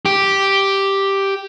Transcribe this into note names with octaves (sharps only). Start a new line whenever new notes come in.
G4